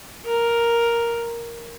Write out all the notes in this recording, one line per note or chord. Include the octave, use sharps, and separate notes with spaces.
A#4